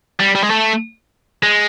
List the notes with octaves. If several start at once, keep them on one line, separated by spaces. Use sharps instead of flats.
G3
G3
G#3
A3
G#3